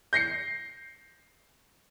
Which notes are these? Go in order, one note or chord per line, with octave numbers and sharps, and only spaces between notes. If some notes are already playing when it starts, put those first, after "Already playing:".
G6 A#6 C7 C#7